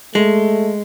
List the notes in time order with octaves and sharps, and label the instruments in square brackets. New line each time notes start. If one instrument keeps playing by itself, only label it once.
[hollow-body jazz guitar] G#3 [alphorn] A3